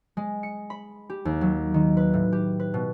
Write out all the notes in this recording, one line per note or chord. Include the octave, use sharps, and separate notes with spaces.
G#3
C#7
B5
G4
D#2
F#3
D#3
B4
A2
G4
B4
B2